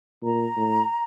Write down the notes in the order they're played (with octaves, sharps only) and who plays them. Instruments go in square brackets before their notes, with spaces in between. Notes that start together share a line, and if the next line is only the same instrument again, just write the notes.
[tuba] A#2 [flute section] A#5
[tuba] A2